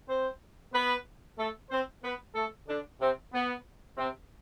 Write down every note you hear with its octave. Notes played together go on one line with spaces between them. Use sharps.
C4 C5
B3 B4
A3 A4
C4 C5
B3 B4
A3 A4
D3 D4
C3 C4
B3
C3 C4